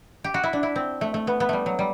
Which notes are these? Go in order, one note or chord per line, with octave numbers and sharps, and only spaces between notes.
G4
F#4
E4
D4
E4
C4
A3
A3
B3
B3
G3 A3
F#3
G3